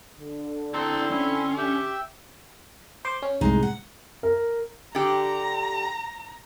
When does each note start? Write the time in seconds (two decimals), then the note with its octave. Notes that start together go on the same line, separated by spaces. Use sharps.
0.19 D3
0.74 C4 E4 A4 A#5 C6
1.11 C#4 E4
1.58 G4 E5 G5 E6
3.05 C5 C6 D6
3.22 C#4
3.41 C2 A2 G#3 D#4
3.63 F#5
4.23 A#4
4.95 D3 G4 A#5